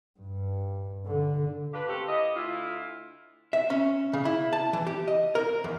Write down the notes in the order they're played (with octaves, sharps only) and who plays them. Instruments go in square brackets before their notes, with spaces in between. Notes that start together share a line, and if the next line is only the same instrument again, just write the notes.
[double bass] G2
D3
[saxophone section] D3 F4 G4 B4
A3 A#3 C4 C#4 G4 A4
E4 G4 D#5
D2 E4 F4
[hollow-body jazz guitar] E5
C#4
C#3
E4
A5
E3
G4
D#5
A#4
E2